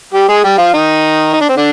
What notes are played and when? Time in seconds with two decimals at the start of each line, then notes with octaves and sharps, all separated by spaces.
0.13 G3 G4
0.28 G#3 G#4
0.44 G3 G4
0.58 F3 F4
0.73 D#3 D#4
1.34 D#4
1.41 D4
1.49 C4
1.56 D3 D4